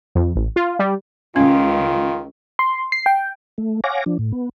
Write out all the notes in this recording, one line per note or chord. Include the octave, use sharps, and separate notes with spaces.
F2
A1
F4
G3
C#2 D#3 C#4 F4
C6
C7
G5
A3
C#5 F5 F#5 G#5 D6 A#6
F3 D4
A2
B3